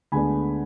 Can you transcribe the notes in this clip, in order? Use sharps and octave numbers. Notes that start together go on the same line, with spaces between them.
D2 D3 G#3 B3 D4 G#5 B5